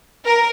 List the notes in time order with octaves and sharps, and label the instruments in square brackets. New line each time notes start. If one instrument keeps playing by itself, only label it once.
[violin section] A#4